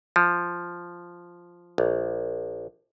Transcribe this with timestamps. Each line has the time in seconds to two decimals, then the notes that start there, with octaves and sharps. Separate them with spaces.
0.16 F3
1.78 A#1